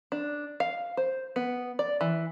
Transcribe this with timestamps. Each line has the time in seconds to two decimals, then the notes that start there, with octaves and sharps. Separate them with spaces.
0.12 D4
0.60 F5
0.97 C5
1.36 B3
1.79 D5
2.01 E3